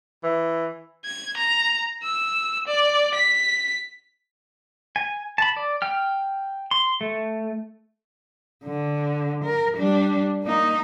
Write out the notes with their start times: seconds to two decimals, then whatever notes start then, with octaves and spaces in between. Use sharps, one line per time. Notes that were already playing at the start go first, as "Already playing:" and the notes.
0.24 E3
1.05 G#6
1.37 A#5
2.04 E6
2.68 D5
3.15 B6
4.96 G#5
5.38 A5 B5
5.57 D5
5.82 G5 F6
6.71 C6
7.01 A3
8.64 D3
9.45 A#4
9.77 G3 D4
10.43 A#3 D#4